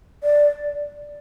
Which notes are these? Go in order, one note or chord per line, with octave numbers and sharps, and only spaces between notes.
D5